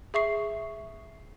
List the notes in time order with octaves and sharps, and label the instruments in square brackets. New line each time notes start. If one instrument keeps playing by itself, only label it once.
[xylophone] G#4 E5 C#6 C7